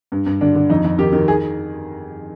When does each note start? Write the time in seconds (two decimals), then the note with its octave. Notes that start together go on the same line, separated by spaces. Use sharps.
0.12 G2
0.26 G2
0.41 D3 D4
0.55 D3
0.70 F2 D#4
0.85 F2
0.98 D#3 G4
1.13 D#3
1.28 G#4